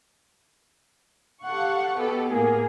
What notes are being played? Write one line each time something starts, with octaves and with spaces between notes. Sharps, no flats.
G4 A4 F5 F#5 C#6
B2 B3 G4 A4
A2 A#3 G#4